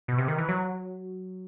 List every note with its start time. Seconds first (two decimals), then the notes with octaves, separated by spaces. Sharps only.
0.08 B2
0.18 C3
0.28 D#3
0.38 E3
0.48 F#3